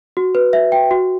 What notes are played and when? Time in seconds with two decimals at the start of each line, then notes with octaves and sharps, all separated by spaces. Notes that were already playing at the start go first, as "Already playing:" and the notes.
0.17 F#4
0.35 B4
0.53 E5
0.72 G5
0.91 F#4